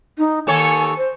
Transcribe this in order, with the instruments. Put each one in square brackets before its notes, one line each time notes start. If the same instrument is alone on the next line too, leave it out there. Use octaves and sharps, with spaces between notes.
[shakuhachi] D#4
[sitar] D#2 A4 C#5 [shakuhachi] G#5
[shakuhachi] C5